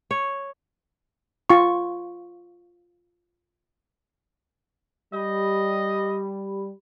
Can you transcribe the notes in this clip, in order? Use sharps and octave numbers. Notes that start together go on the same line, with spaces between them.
C#5
F4 C#6
G3 G4 D#5 B5